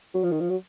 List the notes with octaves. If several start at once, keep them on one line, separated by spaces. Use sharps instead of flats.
F#3
F3
D#3
F3
F#3